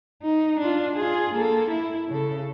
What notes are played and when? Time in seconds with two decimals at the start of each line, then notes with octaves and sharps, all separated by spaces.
0.23 D#4
0.60 D4 F4
0.96 F4 G#4
1.35 A#3 A4
1.70 E4
2.09 C#3 A4